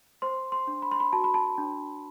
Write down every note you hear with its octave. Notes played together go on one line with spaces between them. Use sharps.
C5 C6
C6
D4
B5
C6
B5
F#4 A5
B5
A5
D4